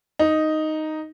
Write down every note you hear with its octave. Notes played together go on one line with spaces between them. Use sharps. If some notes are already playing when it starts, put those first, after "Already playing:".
D#4